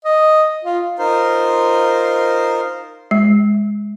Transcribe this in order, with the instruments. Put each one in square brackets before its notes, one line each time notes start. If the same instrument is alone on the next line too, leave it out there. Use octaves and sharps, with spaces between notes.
[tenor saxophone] D#5
F4
[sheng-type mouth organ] D#4 F4 A#4 C5 C6
[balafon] G#3